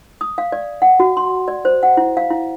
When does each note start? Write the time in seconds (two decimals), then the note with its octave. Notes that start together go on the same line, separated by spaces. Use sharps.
0.21 D#6
0.38 F5
0.52 D5
0.82 F#5
1.00 F#4
1.17 C6
1.48 D5
1.65 C5
1.83 F#5
1.97 E4
2.17 F5
2.30 E4